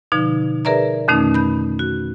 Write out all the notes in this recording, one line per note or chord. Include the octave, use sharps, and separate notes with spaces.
B2 D3 F3 D#4
G#4 A#4 B4 D5 E5 A#5
F2 B2 D#3 A3 C#4 D#4
B5 G6
F#4